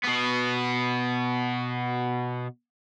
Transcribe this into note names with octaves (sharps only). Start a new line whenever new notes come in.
B2 B3